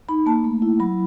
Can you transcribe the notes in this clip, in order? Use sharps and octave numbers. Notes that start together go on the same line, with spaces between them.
D#4 B5
A#3 A5
A3
E4
F#3 B5